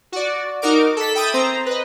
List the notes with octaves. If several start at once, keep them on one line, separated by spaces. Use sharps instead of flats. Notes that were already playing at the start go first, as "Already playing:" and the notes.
F#4 D5
D#4 F#4 A#4 D6
A4 B6
E5 G5 B5 D#6 A6
C4 C5 A#5
B4 D#5